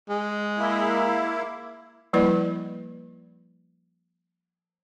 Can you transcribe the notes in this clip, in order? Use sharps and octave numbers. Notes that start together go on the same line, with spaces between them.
G#3
A#3 E4
F3 G3 A#3 E4 B4 D5